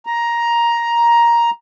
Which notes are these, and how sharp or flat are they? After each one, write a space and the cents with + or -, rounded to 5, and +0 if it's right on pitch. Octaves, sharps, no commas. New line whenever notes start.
A#5 +10